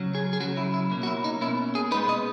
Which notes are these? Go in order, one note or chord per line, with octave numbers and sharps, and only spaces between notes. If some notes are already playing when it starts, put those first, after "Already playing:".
Already playing: C#3 F#3 C#4
G#4
G#4
C#3 F#3 C#4 F#4
E4
E4
B2 A#3 C#4
F#4
E4
D#4
B2 A#3 C#4 E4
G#4
A#2 G#3 B3 D#4 B4
D#5